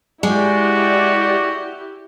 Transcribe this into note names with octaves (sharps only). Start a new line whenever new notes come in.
G#3 E4 F#4 G4 D5